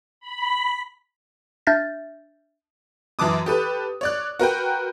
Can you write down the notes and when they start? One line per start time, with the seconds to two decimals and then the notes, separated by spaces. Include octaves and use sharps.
0.20 B5
1.67 D4 E5 F6 G6 A6 A#6
3.19 F#2 E3 A5 D6 D#6
3.46 G4 A4 B4
4.01 C#5 D5 F#6
4.39 F#4 A#4 B4 G5